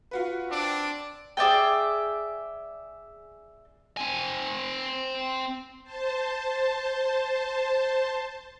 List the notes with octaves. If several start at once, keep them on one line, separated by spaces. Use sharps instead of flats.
F4 F#4 B4
C4 D4 D6
G#4 D5 E5 G5
C4 G#5
C5 A5